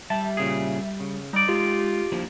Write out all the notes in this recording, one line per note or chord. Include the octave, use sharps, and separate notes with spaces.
G3 G4 E5 A5
A#2 C#3 G#4
C#3
G3 D#4 D5
G#3 F4 G4
F3 A#3 D4 E4